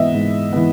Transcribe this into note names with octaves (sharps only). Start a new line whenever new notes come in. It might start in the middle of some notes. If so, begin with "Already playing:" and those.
Already playing: G#2 E3 B3 D#5 E5
G#2
E3 B3